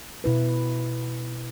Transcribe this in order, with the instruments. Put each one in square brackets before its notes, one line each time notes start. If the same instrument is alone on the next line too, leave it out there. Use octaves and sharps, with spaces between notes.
[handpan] B2 E4 B4